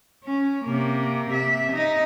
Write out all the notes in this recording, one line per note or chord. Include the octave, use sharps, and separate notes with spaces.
C#4
C3 A#3
C3 E5
D#4 D#5